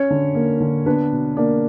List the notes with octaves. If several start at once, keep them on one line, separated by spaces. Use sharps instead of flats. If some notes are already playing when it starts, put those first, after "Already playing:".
Already playing: C#4 C#5
D3
A#3
D3
B3 D4 B4
B2
A#3 D4 D5